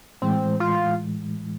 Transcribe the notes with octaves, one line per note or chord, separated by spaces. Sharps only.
A2 E3 G#3 C4
F4